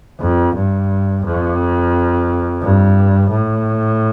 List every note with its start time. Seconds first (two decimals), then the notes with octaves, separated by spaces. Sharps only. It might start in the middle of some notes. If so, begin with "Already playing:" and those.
0.21 F2
0.55 G2
1.25 F2
2.62 G2
3.31 A2